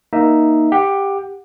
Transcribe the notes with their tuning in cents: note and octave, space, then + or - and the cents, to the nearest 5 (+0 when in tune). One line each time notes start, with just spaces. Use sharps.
A#3 +15 D#4 +0 E5 +0
G4 +10 F#5 -10